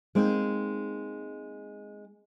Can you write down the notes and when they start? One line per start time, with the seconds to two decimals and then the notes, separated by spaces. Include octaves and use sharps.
0.15 G#3 A#3 C4 D#4